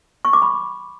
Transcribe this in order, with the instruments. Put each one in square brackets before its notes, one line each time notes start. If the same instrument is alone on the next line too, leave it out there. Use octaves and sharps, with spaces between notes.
[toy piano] C#6
D6
B5